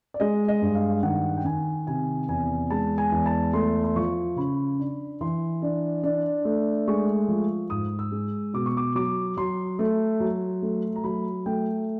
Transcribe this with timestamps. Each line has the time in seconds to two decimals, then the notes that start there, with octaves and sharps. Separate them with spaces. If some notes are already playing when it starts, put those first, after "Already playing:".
0.14 D5
0.20 G#3 D#5
0.48 D#5
0.62 G2
0.75 F5
1.03 D#3 F#5
1.37 G5
1.45 D#3 G#5
1.87 C3 G#5
2.28 E2 G#5
2.70 G#3 A5
2.98 G#5
3.12 E2
3.26 A5
3.53 A3 C6
3.84 C6
3.96 F3 C#6
4.36 C#3 B5
4.79 D4
5.21 E3 C6
5.62 D4
6.03 D4
6.45 A3
6.88 G#3 C#6
7.28 F3
7.70 G#2 D#6
7.99 E6
8.12 G#3
8.54 B2 D6
8.66 C#6
8.77 D6
8.95 F#3 D6
9.37 F#3 C6
9.79 A3
10.20 F#3
10.62 A3
10.96 A#5
11.04 F#3 B5
11.46 A3 G5